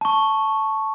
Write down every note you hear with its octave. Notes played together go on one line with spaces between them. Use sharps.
A5 C#6